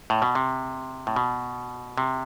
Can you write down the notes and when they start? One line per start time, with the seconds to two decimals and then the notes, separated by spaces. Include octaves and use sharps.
0.10 A2
0.22 B2
0.35 C3
1.07 A2
1.16 B2
1.98 C3